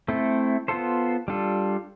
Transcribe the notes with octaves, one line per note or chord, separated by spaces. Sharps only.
A3 C4 E4 A4
B3 F4 A4 C5
G3 D4 F4 A4